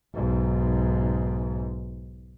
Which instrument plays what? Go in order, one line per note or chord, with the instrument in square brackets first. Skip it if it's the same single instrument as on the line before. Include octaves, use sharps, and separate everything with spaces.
[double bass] B1 G#2